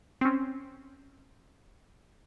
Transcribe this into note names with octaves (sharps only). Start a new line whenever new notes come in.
C4 C#4